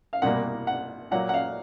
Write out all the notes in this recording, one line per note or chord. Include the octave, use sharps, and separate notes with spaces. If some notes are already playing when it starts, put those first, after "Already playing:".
F5
C2 B2 G3 A#3 F#5
F#5
A#2 F#3 A#3 F#5
F#5
F5